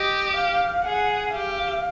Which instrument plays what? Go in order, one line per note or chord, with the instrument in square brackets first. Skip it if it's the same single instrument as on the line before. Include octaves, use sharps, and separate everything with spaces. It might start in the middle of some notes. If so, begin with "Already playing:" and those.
Already playing: [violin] G4 [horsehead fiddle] D#5
[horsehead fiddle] F5
[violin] G#4 [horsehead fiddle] F#5
[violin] G4 [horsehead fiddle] F5